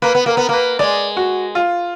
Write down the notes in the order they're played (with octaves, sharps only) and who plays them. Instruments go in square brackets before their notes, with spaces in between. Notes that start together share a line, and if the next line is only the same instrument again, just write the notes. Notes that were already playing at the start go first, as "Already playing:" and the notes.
[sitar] A#3 [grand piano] B4
[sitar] B3
[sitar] A#3 [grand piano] A#4
[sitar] B3
[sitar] A#3 [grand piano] B4
[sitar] G#3 [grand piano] D5
[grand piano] F#4
F4